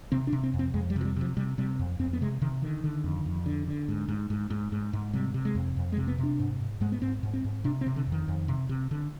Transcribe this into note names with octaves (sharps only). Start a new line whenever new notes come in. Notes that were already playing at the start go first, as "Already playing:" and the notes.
C3 C4
D4
C3
C4
F2
C4
F2 G#3
G3
C3 F3
G3
C3 F3
C3 G3
C3 G3
F2
F2 C4
B3
C3 G#3
C3 D#3
D3 D#3
D3
F2
F2
D3
D3
G#2
G#2
G#2
G#2
G#2
G#2
C3 G3
C3
G#3
F2
F2
G#3
C3
B3
C3
D4
G#2
G#2
G#2 G#3
B3
G#2 C4
G#2
C4
G#2
C3 D4
C4
C3
D3
F2
D#3
F2
C3
C3
D3